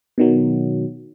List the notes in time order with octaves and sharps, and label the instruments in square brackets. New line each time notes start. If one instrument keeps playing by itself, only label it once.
[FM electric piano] B2 D#3 F#3